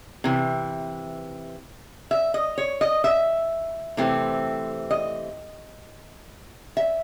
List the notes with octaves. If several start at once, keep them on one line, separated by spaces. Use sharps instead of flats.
C3 E3
E5
D#5
C#5
D#5
E5
C3 E3 A3 C4
D#5
E5